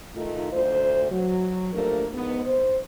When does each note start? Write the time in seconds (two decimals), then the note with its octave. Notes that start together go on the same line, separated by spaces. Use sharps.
0.16 D#3 A3 D#4 F4
0.53 D2 C5
1.11 F#3
1.73 F3 A3 A#3 D4 G4 A#4
2.14 G#2 B3
2.45 C5